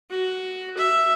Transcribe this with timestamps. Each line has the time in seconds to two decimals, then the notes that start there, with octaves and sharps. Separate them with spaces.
0.11 F#4
0.77 E5